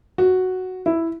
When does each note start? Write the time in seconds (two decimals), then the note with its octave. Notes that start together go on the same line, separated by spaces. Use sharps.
0.18 F#4
0.86 E4